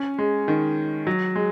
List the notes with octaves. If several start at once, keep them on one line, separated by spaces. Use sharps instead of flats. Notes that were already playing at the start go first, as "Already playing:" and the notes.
Already playing: C#4
G#3
D#3
F#3
G#3